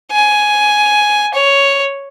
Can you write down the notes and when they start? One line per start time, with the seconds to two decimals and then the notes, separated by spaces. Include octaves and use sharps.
0.11 G#5
1.34 C#5